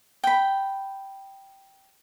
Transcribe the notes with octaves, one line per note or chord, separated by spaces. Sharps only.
G5 B5